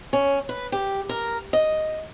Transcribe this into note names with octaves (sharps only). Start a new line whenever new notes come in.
C#4
B4
G4
A#4
D#5